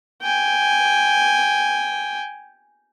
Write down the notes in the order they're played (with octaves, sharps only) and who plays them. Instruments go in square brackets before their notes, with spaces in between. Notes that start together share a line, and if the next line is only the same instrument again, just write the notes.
[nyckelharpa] G5 G#5